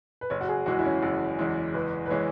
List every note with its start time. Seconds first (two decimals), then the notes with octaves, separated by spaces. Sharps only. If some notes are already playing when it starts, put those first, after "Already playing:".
0.21 B4
0.30 F#1 C#5
0.41 F#4
0.49 G#4
0.66 E2 E3 G#3 F#4
0.79 E4
0.85 C#4
1.02 F#1 F#4
1.39 E2 E3 G#3
1.74 F#1 B4
2.06 B4
2.10 E3 G#3 C#5